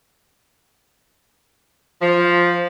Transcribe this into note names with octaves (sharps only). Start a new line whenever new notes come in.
F3